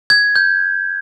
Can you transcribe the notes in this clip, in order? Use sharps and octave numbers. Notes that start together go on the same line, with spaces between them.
G#6
G6